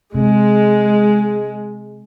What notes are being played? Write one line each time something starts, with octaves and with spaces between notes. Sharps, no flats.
C3 G#3